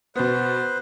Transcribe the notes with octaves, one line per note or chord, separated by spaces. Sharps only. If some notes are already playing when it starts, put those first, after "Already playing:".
B2 B3 B4 C5